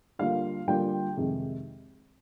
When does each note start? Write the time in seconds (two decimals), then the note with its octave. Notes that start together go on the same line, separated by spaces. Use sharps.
0.19 D3 G3 A#3 F4 F5
0.68 D3 G3 A#3 F4 G5
1.16 F2 C3 D#3 G#3